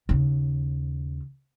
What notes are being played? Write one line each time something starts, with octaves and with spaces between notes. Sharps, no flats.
D#2 C#3